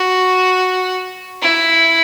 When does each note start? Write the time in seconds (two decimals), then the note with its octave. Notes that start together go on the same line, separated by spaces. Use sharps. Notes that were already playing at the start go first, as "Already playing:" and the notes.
Already playing: F#4
1.42 E4